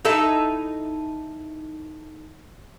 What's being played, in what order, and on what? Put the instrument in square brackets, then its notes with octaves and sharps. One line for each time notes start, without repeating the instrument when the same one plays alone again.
[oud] D#4 E4 A4